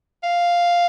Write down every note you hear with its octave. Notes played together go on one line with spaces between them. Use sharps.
F5